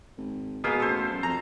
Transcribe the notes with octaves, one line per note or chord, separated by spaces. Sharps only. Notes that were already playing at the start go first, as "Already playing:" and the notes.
G#1
B2 A#3 G#4 F5
A1 A4 C5
F#2
F2 A#5